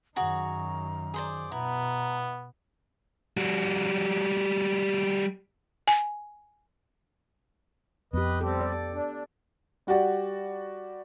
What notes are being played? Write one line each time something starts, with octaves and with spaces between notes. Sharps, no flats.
F#2 D#3 F#4 G#4 C#5 A#5
G#4 C5 D5
B2 B3 E4 A#5
G3 F#4
G#5
F2 B3 G4 B4 D#5
G3 C4 G4 A4
D5
D4
G3 F#4 G4 D5 F#5